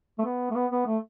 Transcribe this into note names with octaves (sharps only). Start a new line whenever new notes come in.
A3
B3
A3
B3
B3
A3